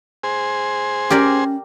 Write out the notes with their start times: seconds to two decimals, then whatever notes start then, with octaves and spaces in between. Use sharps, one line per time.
0.24 G#4 C5
1.10 C#4 G4 A#4 D5